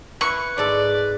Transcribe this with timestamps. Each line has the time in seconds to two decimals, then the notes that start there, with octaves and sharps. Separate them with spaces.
0.21 E4 B4 C#6
0.58 G#2 A4 D5